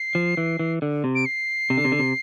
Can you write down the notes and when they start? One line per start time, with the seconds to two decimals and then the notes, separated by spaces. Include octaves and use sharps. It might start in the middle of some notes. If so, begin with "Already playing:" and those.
Already playing: C7
0.15 F3
0.37 E3
0.59 E3
0.82 D3
1.04 C3
1.15 D7
1.26 C7
1.70 C3
1.78 D3
1.85 C3
1.92 D3
1.99 C3